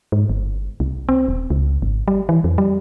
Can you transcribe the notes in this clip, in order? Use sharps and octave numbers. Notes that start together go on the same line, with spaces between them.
G#2
G1
C2
C4
D#1
C#2
G#1
G3
E3
F2
G3